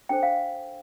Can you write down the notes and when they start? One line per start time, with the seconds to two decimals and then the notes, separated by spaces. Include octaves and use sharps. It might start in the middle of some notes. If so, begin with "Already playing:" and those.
0.09 D4 A4 C5 G5
0.23 F5